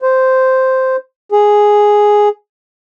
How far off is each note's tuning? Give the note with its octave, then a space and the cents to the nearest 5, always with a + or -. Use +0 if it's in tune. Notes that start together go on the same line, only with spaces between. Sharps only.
C5 -5
G#4 +0